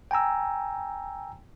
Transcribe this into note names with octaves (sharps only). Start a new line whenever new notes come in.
G5 G#5 A#5 E6